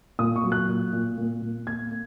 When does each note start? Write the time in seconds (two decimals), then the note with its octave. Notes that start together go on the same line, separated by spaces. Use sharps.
0.19 A#2 D#6
0.36 C#6
0.44 F#3
0.52 F#6
0.68 A#2
0.93 A#2
1.18 A#2
1.42 A#2
1.67 A#3 G#6
1.91 A#3